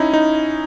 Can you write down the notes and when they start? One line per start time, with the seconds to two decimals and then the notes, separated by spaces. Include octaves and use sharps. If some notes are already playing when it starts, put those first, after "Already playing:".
Already playing: C#4 D#4 E4
0.13 D#4